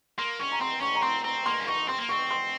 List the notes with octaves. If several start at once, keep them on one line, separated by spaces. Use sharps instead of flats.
A#3 C6
C#4 C#6
A#5
C4 C6
C#4 C#6
A#5
C4 C6
C4 A#5
A#3 C6
C#4
D#4 C#6
C4 C6
A#3
C4 C#6
C6